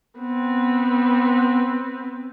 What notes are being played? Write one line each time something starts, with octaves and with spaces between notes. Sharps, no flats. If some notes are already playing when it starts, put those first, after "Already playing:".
B3 C4